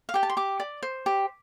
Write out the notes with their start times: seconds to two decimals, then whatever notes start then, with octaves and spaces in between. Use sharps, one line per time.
0.09 F5
0.14 G4 G5
0.23 A5
0.30 C6
0.37 G4 D6
0.60 D5
0.83 C5
1.06 G4